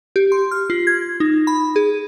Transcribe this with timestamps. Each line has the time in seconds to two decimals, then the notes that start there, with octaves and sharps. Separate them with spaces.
0.16 G4
0.32 C6
0.51 F6
0.70 F4
0.87 G#6
1.20 D#4
1.47 B5
1.76 G#4